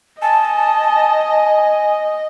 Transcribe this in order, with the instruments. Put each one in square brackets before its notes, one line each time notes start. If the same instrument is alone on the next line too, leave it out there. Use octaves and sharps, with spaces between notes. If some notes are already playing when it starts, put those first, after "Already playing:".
[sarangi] D#5 [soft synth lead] G#5 [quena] A5